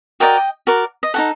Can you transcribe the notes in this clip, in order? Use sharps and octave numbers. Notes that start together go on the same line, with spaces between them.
F#4 A#4 D5 D#5 G5
F#4 A#4 D5
D#5
D#4 F#4 A4 F#5